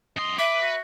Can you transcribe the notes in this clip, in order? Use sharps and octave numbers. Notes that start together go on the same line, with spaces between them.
F#2 D#5 C6
B4 E5 D6
F#4